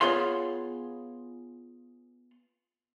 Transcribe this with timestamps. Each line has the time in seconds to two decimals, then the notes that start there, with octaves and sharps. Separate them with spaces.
0.01 B3 F4 G#4 C#5 F5 C6